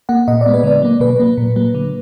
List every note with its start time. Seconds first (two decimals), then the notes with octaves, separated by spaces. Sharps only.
0.09 A#3 F#5
0.28 A#2 D#5
0.41 D5
0.46 G#3 B3
0.54 B4
0.64 D3 D5
0.82 F#3 A#3
1.00 B2 B4
1.20 F#3 A#3
1.37 A#2
1.56 F#3 A#3
1.75 D3